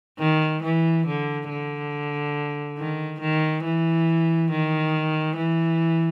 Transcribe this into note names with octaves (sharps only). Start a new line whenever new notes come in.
D#3
E3
D3
D3
D#3
D#3
E3
D#3
E3